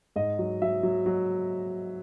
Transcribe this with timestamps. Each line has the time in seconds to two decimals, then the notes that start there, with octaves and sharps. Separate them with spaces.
0.16 G#2 D#5
0.39 F#3
0.62 F#3 E5
0.83 F#3
1.06 F#3